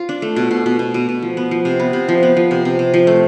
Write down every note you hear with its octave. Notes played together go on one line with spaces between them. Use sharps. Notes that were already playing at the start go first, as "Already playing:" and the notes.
Already playing: F4
D4
A3
B2
B2
B2
B2
B2
B2
F3
B3
F3
C3
B3
C3
F3
B3
F3
C3
C3
C3
F3
A3